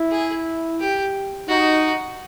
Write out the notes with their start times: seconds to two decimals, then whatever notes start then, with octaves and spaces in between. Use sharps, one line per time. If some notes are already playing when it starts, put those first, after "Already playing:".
Already playing: E4
0.11 G#4
0.80 G4
1.49 D#4 F#4